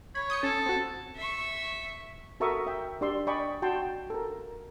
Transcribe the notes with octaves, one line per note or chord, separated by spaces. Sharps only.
C#5 B5
D#6 G6 C#7
C#4 A4
C4 F#4
E5 C#6
F#4 A4 A#4 E5 C#6 D#6
E5 G5
D4 G4 D5 C6 E6
D5 D#5 G5 G#5 B5 C#6
F#4 G5 A5 C6
A4 A#4